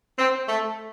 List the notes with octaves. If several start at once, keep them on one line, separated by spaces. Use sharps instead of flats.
C4
A3